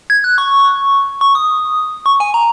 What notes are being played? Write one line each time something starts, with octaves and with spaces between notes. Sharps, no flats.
G#6
F#6
C#6
C#6
D#6
C#6
G#5
A#5